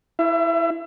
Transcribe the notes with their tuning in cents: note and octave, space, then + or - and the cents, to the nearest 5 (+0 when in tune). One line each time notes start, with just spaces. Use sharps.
E4 +0 E5 +35